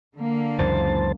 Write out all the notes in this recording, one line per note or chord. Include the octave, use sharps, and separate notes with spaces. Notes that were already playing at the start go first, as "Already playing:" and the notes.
D3 A#3
C#2 F#2 E3 C5 A5